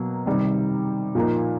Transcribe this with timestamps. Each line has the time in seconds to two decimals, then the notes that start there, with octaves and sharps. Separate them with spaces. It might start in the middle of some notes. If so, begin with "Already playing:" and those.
Already playing: B2 F#3 A#3
0.26 C3 D#3 G3
1.15 A#2 F3 A#3 D#4